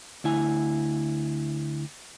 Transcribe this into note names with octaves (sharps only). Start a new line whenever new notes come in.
D2 E4 G#5